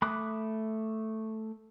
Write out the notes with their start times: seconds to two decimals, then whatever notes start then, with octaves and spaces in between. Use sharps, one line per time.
0.02 A3 B5 D6 D#6 F#6